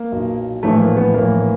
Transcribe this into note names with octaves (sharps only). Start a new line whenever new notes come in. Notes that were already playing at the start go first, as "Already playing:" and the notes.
Already playing: A#3
B1 A#2
A#1 A2 E3 A3
A#3
B3
A#1 A2 E3 A#3